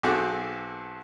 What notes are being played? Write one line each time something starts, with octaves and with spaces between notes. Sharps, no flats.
B1 C4 F#4 G#4 A4 D6